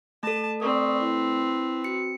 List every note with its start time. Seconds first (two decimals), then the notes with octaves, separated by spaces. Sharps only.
0.23 A3 A4 A5
0.60 C4 B4 D5 C#6 D#6
1.00 E4
1.84 F#4 C#7